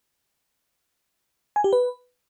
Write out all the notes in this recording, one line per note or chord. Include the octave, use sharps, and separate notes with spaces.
G#5
G4
B4